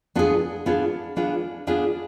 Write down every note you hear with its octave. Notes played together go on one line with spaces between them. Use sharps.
B3 D4 F4 G#4
B3 D4 F4 G#4
B3 D4 F4 G#4
B3 D4 F4 G#4